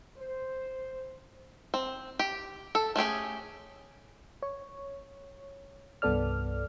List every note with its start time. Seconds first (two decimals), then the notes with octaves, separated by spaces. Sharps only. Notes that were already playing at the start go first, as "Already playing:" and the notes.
0.18 C5
1.74 C4
2.19 G4
2.75 A4
2.96 A3 C#4 G4 G#4
4.42 C#5
6.02 C2 G2 B3 A4 D5 F6